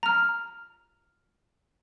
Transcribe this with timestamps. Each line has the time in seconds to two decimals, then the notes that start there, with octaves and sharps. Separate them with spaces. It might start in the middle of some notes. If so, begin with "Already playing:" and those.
0.03 A#5 F6